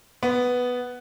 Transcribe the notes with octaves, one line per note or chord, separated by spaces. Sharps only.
B3